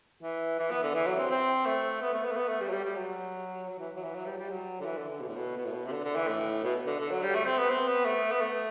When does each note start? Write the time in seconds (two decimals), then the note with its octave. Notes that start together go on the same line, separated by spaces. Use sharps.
0.23 E3
0.59 E3
0.71 B3
0.83 D3
0.95 E3
1.06 F#3
1.18 C4
1.31 C4
1.66 A3
2.02 B3
2.14 A3
2.25 B3
2.32 A3
2.37 B3
2.48 A3
2.61 G3
2.68 F#3
2.72 G3
2.84 G3
2.95 F#3
3.70 F#3
3.79 E3
3.96 F#3
4.03 E3
4.15 F#3
4.26 G3
4.38 G3
4.50 F#3
4.81 D3
4.85 E3
4.98 D3
5.09 D3
5.21 B2
5.28 A2
5.36 B2
5.57 B2
5.66 A2
5.73 B2
5.87 C3
5.92 D3
6.04 D3
6.16 E3
6.28 A2
6.64 B2
6.87 D3
6.99 D3
7.11 F#3
7.23 G3
7.35 A3
7.46 C4
7.58 B3
7.70 C4
7.88 B3
8.06 A3
8.31 B3
8.41 A3